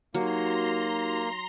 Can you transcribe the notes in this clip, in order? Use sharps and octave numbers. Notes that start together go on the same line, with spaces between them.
F#3 A#3 D#4 F#4 G4 A#5 C6